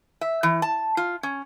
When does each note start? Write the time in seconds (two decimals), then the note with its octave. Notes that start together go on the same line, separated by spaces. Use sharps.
0.21 E5
0.43 E3
0.62 A5
0.97 F4
1.23 C#4